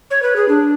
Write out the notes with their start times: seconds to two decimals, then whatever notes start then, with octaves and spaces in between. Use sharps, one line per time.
0.11 C#5
0.22 B4
0.36 G#4
0.49 D4